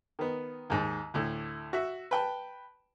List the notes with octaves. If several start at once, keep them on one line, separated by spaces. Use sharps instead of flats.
D#3 B3
D#2 G#2
D2 A2
F#4 E5
B4 G5 A5